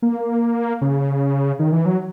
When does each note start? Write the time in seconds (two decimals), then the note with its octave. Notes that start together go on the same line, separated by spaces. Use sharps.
0.02 A#3
0.81 C#3
1.59 D#3
1.72 E3
1.86 F#3